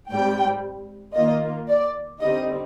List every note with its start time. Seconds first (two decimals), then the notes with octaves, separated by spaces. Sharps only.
0.11 G#2 G3 C4 G5
1.16 D#3 A#3 F4 D#5
1.69 D5
2.21 D3 G3 C4 D#4 D#5